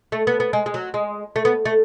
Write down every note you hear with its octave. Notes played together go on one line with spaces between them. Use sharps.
A3
B3
B3
G#3
G#3
F#3
G#3
A3
B3
A3